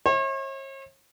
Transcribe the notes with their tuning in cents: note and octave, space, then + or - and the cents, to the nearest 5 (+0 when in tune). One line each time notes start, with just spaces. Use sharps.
C#5 -45 E5 -35